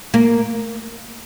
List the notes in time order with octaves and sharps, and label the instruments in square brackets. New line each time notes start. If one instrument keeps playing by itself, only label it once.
[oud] A#3